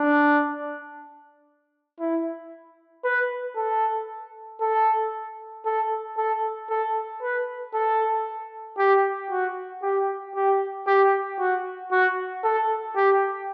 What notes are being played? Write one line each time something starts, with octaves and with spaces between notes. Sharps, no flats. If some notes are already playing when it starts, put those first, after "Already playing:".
Already playing: D4
E4
B4
A4
A4
A4
A4
A4
B4
A4
G4
F#4
G4
G4
G4
F#4
F#4
A4
G4